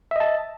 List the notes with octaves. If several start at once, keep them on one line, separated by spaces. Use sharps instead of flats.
D#5 E5 A5